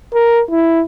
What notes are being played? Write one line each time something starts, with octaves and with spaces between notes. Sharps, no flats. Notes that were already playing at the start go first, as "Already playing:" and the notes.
A#4
E4